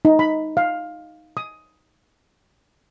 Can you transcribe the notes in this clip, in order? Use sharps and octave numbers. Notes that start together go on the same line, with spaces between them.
D#4
B5
F5
D#6